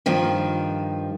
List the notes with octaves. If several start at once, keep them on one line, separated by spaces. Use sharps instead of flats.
G2 D#3 F3